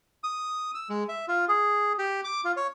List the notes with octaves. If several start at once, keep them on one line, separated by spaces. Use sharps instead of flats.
D#6
E6
G#3
E5
F4
G#4
G4
D6
F4
C#5